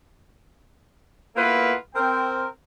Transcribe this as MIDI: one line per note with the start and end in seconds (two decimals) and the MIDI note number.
1.36 1.73 58
1.36 1.73 59
1.36 1.73 64
1.36 1.73 65
1.36 1.73 69
1.36 1.73 71
1.95 2.44 60
1.95 2.44 70
1.95 2.44 79